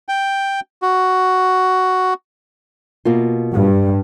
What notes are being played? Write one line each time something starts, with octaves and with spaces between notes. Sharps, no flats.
G5
F#4
B2 A#3 F4
G2